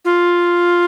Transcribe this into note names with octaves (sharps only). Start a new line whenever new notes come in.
F4